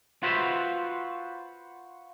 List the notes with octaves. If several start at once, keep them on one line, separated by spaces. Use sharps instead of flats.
F4 F#4 B4 C5 E5